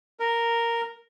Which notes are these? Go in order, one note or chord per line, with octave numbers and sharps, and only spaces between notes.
A#4